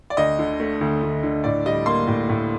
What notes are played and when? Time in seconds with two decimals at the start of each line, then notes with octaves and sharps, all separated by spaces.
0.10 D5
0.17 D2 D#5
0.39 D3
0.60 A3
0.81 D2
1.03 D2
1.23 D3
1.44 A2 D5
1.66 G3 D#5
1.86 A#3 C6
2.07 A2
2.29 A2